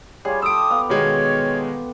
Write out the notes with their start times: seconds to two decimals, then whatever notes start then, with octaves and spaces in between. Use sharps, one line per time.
0.25 G3 F4 G#4 C#5
0.42 G4 A4 D#6 E6 D7
0.71 B3 F5
0.90 B2 D#3 G#3 C#5